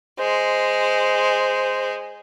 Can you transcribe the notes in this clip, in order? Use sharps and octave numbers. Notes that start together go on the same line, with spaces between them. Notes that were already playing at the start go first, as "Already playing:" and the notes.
G#3 C5